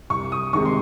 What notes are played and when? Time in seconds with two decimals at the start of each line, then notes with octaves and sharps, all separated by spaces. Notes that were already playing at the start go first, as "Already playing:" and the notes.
0.10 C2 C#6
0.32 D#6
0.53 C3 D#3 G#3 C4 C#6
0.65 C6